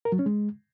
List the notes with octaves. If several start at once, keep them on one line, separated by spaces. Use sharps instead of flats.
A#4
F#3
C#4
G#3